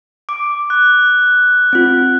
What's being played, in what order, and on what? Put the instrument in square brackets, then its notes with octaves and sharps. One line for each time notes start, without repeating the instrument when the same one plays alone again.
[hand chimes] D6
[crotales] F#6
[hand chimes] C4 F4